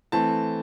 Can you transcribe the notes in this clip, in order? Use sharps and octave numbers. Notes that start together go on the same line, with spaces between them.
E3 A3 C4 A5